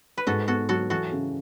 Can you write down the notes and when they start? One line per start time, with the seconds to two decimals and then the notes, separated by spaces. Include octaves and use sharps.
0.18 B4
0.27 G#2 F#4 A4
0.48 B3 F#4 A4
0.69 F#3 F#4 A4
0.90 E3 F#4 A4
1.12 C#3